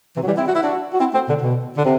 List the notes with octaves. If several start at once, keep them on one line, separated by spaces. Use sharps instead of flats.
C3 E3
F#3
E3 G3
C4 E4
F#4
E4
D4 F#4
F#4
C4 E4
A3 C4
B2 D3
B2
D3
C3